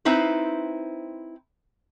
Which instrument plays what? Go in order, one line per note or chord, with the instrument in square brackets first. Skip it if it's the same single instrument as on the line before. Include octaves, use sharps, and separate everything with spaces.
[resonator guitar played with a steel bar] C4 D#4 E4 B4 C5